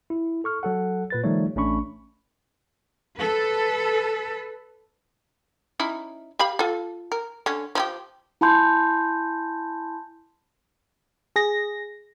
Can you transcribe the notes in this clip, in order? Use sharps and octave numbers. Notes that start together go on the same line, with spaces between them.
E4
A4 C#6 F6
F#3 A4 F#5
A#2 B4 A6
D#3 F3 G3 A3 D#4 C#5
A1 A3 C#4 D4 B5 C#6
A4 B4
C#4 D#4 E4
G4 F5 B5
F4 A4
A#4
D3 C#4
F3 E4 G4
E4 G#5 A5 B5 C6 G6
G#4 A#6